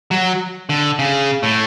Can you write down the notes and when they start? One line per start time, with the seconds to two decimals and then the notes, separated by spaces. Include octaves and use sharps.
0.11 F#3
0.69 D3
0.99 C#3
1.43 A2